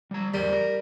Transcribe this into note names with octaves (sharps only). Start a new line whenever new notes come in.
G3 A#5
E2 G3 A#4 C5
A#4